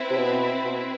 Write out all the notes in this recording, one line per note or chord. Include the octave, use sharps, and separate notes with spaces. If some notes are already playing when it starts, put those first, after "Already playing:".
Already playing: C4 E4 B4
C3
B2
B2